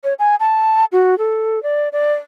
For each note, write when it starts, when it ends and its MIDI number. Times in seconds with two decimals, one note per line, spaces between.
0.04 0.14 73
0.19 0.36 80
0.40 0.85 81
0.92 1.18 66
1.18 1.62 69
1.63 1.89 74
1.93 2.13 74